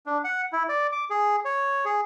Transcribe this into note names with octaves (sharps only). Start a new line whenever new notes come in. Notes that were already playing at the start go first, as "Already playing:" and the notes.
D4
F#5
E4
D5
D6
G#4
C#5
G#4